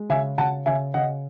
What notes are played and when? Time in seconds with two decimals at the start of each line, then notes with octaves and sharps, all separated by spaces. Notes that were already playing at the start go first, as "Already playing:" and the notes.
Already playing: G#3
0.09 C#3 E5 G#5
0.38 C#3 F#5 A5
0.66 C#3 E5 G#5
0.94 C#3 D#5 F#5